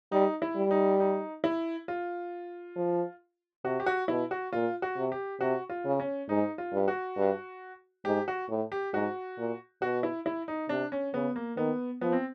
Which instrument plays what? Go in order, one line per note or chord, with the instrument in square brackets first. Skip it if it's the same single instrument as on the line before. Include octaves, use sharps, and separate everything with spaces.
[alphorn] G3 [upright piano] D#4
[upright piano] E4
[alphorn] G3
[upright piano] D#4
D#4
E4
F4
[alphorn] F3
[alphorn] C3 [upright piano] F#4
[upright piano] G4
F#4
[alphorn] B2 [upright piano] E4
[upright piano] F#4
[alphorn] A#2 [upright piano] F4
[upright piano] F#4
[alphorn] C3
[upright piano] G4
[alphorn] C3 [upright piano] F#4
[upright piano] F4
[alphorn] C#3
[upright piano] C#4
[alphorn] G#2 [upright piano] D#4
[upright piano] F4
[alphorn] G2
[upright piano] F#4
[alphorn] G2
[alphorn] G#2 [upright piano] G4
[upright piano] F#4
[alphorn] A2
[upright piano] G4
[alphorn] G#2 [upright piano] F#4
[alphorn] A#2
[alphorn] B2 [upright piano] F#4
[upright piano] E4
E4
D#4
[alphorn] C3 [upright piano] D4
[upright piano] C#4
[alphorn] C#3 [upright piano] B3
[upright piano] A#3
[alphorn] D#3 [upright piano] B3
[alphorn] F3 [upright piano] B3
[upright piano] C4